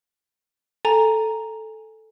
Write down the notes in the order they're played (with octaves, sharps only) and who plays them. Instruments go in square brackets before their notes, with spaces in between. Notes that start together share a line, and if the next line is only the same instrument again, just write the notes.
[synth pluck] A4 [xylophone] G#5 A#5